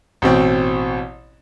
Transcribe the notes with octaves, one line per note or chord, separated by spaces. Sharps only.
A1 B2 C4